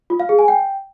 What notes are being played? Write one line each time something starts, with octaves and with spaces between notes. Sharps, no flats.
F4
F5
G#4
G#5
G5